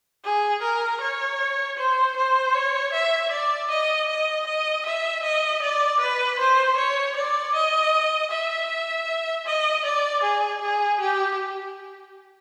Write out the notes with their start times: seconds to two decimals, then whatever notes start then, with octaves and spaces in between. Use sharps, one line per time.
0.24 G#4
0.62 A#4
1.01 C#5
1.77 C5
2.17 C5
2.55 C#5
2.93 E5
3.32 D5
3.70 D#5
4.09 D#5
4.47 D#5
4.86 E5
5.23 D#5
5.62 D5
6.00 B4
6.39 C5
6.77 C#5
7.16 D5
7.55 D#5
8.31 E5
9.46 D#5
9.85 D5
10.23 G#4
10.62 G#4
11.00 G4